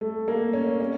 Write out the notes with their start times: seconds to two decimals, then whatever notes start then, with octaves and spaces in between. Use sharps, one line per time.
0.01 A3
0.28 A#3
0.53 C#4
0.80 C#4